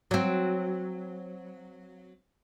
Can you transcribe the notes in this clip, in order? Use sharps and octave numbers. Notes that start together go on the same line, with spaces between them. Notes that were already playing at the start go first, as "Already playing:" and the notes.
F#3 C4